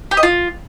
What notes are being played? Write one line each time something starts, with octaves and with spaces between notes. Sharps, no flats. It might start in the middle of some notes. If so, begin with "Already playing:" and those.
G4
D#5
F4